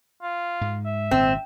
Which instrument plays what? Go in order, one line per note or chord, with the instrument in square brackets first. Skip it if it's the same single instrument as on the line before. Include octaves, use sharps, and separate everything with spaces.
[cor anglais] F4
[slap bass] G#2 G#3
[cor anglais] E5
[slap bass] G#1 A#2 [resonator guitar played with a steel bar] C4